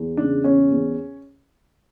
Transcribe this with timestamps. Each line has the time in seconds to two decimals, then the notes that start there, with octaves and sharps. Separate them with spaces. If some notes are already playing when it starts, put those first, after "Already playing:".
Already playing: E2
0.17 C#3 D4
0.44 E2 C#4
0.70 E2